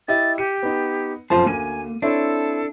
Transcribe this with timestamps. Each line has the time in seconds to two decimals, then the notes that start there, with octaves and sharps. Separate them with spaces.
0.08 E4 G4 D#5 A6
0.38 G4 C#7 D#7
0.63 B3 D#4
1.30 F#1 F2 F4 C5 A5
1.46 D2 A#3 G#5 D#7
2.02 C4 D4 E4 A4 C#5